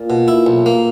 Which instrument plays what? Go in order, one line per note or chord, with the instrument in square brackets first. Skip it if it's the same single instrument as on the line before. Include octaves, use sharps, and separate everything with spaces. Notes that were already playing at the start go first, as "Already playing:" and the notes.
Already playing: [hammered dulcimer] A#2
[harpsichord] B2
E4
B1
A#3